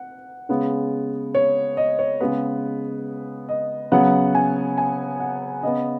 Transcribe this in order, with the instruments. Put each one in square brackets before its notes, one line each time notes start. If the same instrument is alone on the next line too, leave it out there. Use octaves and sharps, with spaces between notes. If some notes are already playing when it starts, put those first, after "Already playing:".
Already playing: [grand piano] F#5
C#3 G#3 B3
C#5
D#5
C#5
C#3 G#3 B3 B4
D#5
C#3 F#3 B3 F#5
G#5
G#5
F#5
C#3 B3 D#5